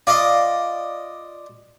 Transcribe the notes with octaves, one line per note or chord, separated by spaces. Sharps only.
F4 D5 D#5 F5